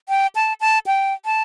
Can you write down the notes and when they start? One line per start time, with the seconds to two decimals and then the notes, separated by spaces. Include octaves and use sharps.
0.09 G5
0.35 A5
0.61 A5
0.87 G5
1.25 A5